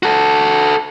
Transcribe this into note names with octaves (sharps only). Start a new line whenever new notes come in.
F#4 A4